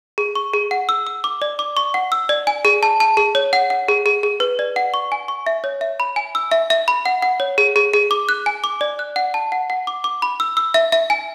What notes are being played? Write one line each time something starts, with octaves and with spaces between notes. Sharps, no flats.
G#4
C#6
G#4
F#5
E6
E6
D6
D5
D6
C#6
F#5
E6
D5
G#5
G#4
A5
A5
G#4
C#5
F#5
F#5
G#4
G#4
G#4
B4
D5
F#5
C#6
G#5
C#6
E5
C#5
E5
B5
G#5
E6
E5
E5
B5
F#5
F#5
C#5
G#4
G#4
G#4
D6
F#6
G#5
D6
D5
F#6
F#5
A5
F#5
F#5
D6
D6
B5
E6
E6
E5
E5
G#5